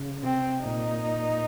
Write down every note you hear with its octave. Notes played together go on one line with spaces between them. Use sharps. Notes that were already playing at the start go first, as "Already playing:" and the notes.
Already playing: C#3
C3 C4
A#2 D#4